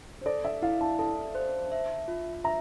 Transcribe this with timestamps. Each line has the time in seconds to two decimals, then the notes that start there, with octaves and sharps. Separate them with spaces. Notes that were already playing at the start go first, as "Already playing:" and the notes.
0.21 C5
0.26 A4 D5
0.45 E5
0.62 E4 F5
0.81 A5
0.99 A4 A5
1.35 C5
1.72 E5
2.08 F4
2.44 E5 A#5